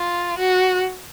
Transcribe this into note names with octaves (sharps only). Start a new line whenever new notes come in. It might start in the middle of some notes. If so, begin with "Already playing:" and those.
Already playing: F4
F#4